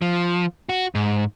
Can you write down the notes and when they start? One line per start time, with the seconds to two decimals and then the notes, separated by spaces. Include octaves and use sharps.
0.02 F3
0.69 F#4
0.95 G#2